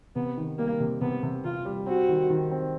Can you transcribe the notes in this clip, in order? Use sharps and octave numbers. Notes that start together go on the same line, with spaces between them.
C3 B3
D#3
G3 A#3
C3
C3 B3
C3
C3 F4
G3
C4 F#4
D#3
D#3
C4